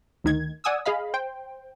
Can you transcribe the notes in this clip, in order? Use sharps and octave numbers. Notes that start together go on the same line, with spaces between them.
D2 D#3 G#6
D5 F#5 G#5 D#6 E6
G#4 D#5 F5 B5
C5 G5